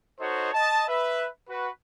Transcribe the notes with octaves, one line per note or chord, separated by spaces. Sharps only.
D#4 F#4 A4 C5 C#5 D#5
D#5 A5
B4 E5
F#4 B4